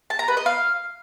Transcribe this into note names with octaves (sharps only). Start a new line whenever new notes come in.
A5
A#5
B4
D#5
F5